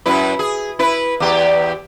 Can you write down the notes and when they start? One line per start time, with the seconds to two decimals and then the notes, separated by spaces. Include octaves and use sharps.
0.06 F#2 E4 B4
0.39 G#4
0.79 E4 B4
1.20 E2 G4